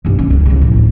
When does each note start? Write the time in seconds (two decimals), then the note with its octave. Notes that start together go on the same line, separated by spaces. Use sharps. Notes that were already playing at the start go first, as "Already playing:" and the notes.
0.05 B1 G2
0.19 C#4
0.30 C#2
0.46 C#3 F3
0.62 A2
0.75 D2